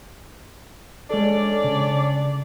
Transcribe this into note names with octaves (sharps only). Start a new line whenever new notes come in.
G#3 C#4 D4 A4 D5
C#3